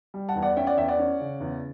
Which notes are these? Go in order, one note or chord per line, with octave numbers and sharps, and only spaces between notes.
G3
F#5 A5
E2
D5 F#5
C#4 E5 G5
D5 F#5
E2 E5 G5
D5 F#5
C#4
C#3
E2